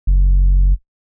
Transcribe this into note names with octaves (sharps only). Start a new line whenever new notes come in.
F#1